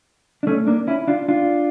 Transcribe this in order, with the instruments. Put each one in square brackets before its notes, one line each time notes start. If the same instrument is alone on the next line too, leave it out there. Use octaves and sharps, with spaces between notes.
[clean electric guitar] D4
A3 C#4
A#3 D4
C#4 E4
D4 F4
D4 F4